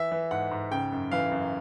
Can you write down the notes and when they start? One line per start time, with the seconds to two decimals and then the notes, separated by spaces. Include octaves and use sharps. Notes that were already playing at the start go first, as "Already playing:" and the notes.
Already playing: E3 E5
0.12 E3
0.31 G#2 F#5
0.51 G#2
0.71 C#3 G5
0.92 F#2
1.12 E3 F5
1.32 F#2